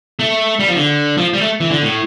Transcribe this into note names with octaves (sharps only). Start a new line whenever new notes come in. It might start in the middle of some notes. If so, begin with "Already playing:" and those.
A3
G3
F3
D3
F3
G3
A3
E3
D3
A2